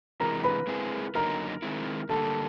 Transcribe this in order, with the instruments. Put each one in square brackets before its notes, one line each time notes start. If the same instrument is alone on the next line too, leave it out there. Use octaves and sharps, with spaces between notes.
[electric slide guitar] C3 E3 G#3 [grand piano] A#4 A#5
[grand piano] B4 B5
[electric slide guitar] G#3 C4 E4 G#4
[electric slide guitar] F#2 D3 F#3 A#3 D#4 [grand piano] A#4 A#5
[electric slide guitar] D#3 G#3 C4 E4
[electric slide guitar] G2 D3 G3 A#3 [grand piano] A4 A5